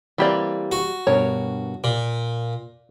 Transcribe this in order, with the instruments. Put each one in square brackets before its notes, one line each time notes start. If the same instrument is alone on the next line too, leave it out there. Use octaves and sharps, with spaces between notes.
[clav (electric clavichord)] E3 A#3 C4 [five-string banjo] G3 G4 D5
[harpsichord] F#4
[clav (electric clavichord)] G2 B2 A#4 [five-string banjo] C#5
[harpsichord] A#2 [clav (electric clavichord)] D5